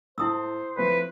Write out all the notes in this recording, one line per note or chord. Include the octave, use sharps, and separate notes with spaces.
A2 E4 C5 A5 D#6 E6
F3 A3 C4 B4